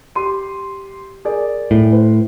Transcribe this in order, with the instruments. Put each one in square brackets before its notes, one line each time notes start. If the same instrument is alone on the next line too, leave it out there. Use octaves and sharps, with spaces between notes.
[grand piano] G4 C6 D#7
G#4 A#4 D5
[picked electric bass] A2
[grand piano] B4 C5